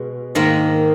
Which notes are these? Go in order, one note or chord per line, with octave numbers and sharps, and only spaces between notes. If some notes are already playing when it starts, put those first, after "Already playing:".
Already playing: B2 G#3
G#2 D#3 A#3